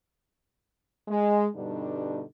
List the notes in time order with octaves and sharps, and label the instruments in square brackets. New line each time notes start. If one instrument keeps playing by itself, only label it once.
[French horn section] G#3
G2 B2 D3 G3 D4 D#4